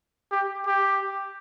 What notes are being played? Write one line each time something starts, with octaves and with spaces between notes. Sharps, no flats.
G4
G4